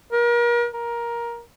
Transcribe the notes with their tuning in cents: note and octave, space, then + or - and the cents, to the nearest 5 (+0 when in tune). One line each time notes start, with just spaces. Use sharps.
A#4 +35
A#4 +15